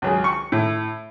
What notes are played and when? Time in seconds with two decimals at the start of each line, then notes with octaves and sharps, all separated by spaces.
0.02 C#2 F#3 G#4
0.24 C#6
0.52 A2